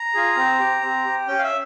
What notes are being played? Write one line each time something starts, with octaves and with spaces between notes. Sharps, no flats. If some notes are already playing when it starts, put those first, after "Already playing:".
Already playing: A#5
F4 G#4
C4
G4
C4
G4
C#4 G5
F5
E5